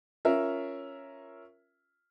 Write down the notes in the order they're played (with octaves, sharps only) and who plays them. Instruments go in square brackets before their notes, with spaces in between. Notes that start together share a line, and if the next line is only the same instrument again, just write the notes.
[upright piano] C#4 F4 A#4 E5